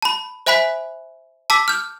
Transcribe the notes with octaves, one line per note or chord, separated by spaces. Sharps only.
A5 B5
C5 E5 G#5 B5 F#6 B6
A5 D6 E6 B6
F6 G6